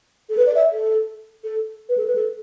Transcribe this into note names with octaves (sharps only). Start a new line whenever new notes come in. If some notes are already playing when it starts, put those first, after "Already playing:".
A4
B4
D5
E5
A4
A4
B4
A4
B4
A4